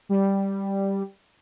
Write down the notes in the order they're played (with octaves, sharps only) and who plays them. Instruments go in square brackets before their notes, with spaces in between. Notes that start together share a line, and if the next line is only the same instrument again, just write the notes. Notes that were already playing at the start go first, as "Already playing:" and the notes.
[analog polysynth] G3